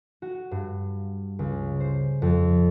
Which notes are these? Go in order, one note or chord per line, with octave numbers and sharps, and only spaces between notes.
F#4
G2
C#2
C5
F2